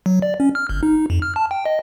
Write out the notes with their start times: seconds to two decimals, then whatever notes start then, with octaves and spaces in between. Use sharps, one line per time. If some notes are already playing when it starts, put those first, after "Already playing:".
0.06 F#3
0.22 D5
0.40 C#4
0.55 F6
0.69 G1
0.83 D#4
0.96 D#4
1.10 F2
1.22 F6
1.36 A5
1.51 G5
1.66 D#5